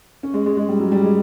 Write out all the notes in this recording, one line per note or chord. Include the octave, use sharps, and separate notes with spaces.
C#4
G#3
G#3
G#3
G3
F#3
G3
G#3